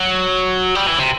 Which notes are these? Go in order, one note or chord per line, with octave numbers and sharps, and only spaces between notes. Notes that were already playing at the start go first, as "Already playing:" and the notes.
Already playing: F#3
G3
E3
C3